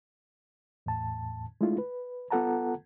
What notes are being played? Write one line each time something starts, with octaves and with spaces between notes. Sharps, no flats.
E2 A2 A5
G#3 A3 D4 E4 F4
B4
B3 F4 A4 F#5 A5 A#5